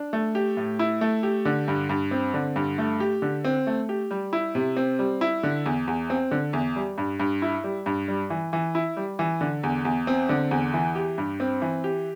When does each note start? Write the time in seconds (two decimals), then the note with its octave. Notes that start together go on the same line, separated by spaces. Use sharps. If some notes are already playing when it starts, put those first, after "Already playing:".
Already playing: D4
0.13 A3
0.35 G4
0.57 A2
0.79 E4
1.01 A3
1.23 G4
1.45 D3
1.68 G2
1.89 G2
2.11 C4
2.34 D3
2.56 G2
2.78 A3
3.00 G4
3.22 D3
3.45 C4
3.67 A3
3.89 G4
4.11 G3
4.33 E4
4.55 C3
4.77 C4
4.99 G3
5.21 E4
5.43 D3
5.66 E2
5.87 E2
6.10 C4
6.31 D3
6.53 E2
6.76 G3
6.98 G2
7.20 G2
7.42 E4
7.64 G3
7.86 G2
8.08 G3
8.30 E3
8.53 E3
8.75 E4
8.97 G3
9.19 E3
9.41 D3
9.63 E2
9.85 E2
10.07 C4
10.29 D3
10.51 E2
10.74 E3
10.95 G4
11.18 G2
11.40 C4
11.62 E3
11.84 G4